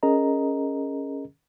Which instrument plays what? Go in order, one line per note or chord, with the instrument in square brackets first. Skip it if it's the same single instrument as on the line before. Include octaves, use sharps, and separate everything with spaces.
[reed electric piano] C#4 G#4 A#4 D#5 A#5